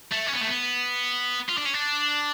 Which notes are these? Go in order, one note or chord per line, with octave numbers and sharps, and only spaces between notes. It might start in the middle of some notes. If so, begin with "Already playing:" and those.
A3
C#4
B3
A3
B3
F4
D4
C#4
D4